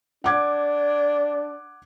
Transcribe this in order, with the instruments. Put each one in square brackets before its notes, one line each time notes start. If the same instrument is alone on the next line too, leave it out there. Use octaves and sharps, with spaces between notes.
[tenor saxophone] D4 [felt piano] F#5 D6 G#6